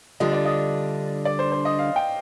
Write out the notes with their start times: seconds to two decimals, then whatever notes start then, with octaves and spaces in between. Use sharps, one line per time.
0.20 D3 G3 D4 F4 D#5
0.33 D5
0.45 D#5
1.25 D5
1.39 C5
1.52 C5
1.65 D#5
1.79 F5
1.96 G5